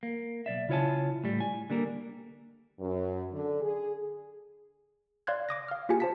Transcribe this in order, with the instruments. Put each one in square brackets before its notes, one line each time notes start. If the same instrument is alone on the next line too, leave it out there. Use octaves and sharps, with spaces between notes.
[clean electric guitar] A#3
B1 D5 E5
C#3 E4 F4 C#5 G#5 A5
A2 G3
G#5
D3 G3 A#3 A#4
[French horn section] F#2
D3
G#4
[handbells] D5 F5 C6 F#6 G#6
D6 D#6 A#6
F5 F6
A#3 F4 G4 G#4 G#5 C#7
C5 A5 B6